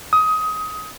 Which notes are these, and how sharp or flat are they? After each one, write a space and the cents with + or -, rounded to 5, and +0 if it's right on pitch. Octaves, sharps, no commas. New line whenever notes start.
D#6 +20